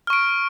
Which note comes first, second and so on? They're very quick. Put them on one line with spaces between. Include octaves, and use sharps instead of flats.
F6 C#6 D7